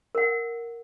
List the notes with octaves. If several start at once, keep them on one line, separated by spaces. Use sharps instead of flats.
A#4 F#5